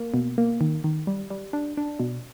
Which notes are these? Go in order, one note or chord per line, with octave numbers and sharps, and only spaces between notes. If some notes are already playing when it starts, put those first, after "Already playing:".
Already playing: A#3
B2
A#3
D#3
D#3
G3
G3
D4
D4
B2